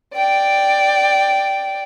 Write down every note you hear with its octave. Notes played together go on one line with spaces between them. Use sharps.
D5 G5